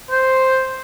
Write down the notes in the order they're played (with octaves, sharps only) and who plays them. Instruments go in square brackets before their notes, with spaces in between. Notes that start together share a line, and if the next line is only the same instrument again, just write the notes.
[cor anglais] C5